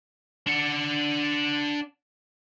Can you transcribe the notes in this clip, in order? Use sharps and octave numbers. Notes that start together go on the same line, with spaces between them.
D4 F#5